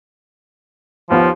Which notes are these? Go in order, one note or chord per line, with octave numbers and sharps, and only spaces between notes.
D#2 F3 B3 F4